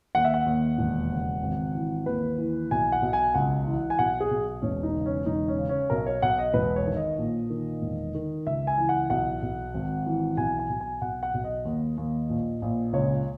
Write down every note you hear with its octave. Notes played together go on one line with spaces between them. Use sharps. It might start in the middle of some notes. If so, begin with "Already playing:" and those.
D#2 F#5
E5
F#5
D#2
E1
C#3
G#1
E3
D#2 B4
E3
B1 G#5
F#5
B1
G#5
C#2 F#5
E3
G#5
B1 F#5
G#4
B1
E1 C#4
D#4
C#3
C#4
E1 D#4
C#4
C#3
C#4
B1 A#4
C#5
B1 F#5
D#5
E1 B4
C#5
D#3
D#5
A#1
D#3
E1
D#3
C#2 E5
G#5
E3
F#5
B1 F#5
B1
G#1
E3
B1 G#5
G#5
B1
G#5
B1 F#5
F#5
B1
D#5
D#2
D#2
A#1
A#1
C#2 C#5